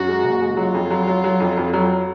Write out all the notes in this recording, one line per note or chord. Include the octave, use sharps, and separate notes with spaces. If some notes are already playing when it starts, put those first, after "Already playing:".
Already playing: F#2 F#4
G#3
F#1
G#3
F#3 F4
F2
F#3
F#3
F#3
F2
F2
F#3